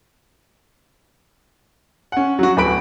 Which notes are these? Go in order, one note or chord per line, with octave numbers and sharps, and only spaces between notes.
C#4 F#5
F#3 F#4
D1 B4 B5 D7